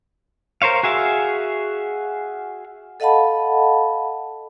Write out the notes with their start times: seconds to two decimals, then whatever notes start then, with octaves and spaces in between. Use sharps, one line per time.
0.62 A#4 C5 C#5 F5
0.83 F#4 G#4 E5 F5
3.00 A4 D#5 F5 F#5 A5 B5